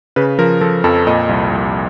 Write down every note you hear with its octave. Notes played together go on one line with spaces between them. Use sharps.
C#3 B4
F3 A#4
F3 A4
F2 A4
A#2 D#5
C2
C2